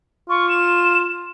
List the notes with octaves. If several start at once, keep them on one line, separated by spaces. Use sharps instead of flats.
F4 C#6
E7